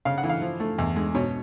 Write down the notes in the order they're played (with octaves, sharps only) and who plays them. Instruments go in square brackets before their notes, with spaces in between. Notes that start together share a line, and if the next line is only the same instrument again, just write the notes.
[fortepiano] C#3 F5
F#5
E3
F5
F3
A3
E2
G#3
B2 C#5